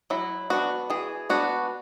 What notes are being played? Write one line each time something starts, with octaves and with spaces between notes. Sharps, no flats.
F#3 E4
B3 D4 F#4
E3 G#4
B3 D4 F#4